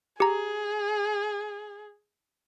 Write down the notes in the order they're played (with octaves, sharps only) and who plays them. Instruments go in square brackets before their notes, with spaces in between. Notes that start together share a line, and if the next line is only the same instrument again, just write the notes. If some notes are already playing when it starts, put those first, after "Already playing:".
[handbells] G4 A#5 [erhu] G#4